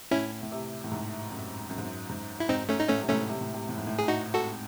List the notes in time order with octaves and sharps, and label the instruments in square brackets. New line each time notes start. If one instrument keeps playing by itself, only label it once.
[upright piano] A2 [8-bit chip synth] C#4 E4
[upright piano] A2
C3
A2
G#2
F#2
F#2
G#2
F#2
G#2
[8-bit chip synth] E4
[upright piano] G#2 [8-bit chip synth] C4 D#4
[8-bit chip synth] A3 C#4
D#4
[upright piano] A2 [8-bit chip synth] A3 C#4
[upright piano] C3
[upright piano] A2 [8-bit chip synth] A3 C#4
[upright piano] C3
A2
C3
A2
G#2
A2
[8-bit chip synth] G#4
D#4 F#4
F#4 A4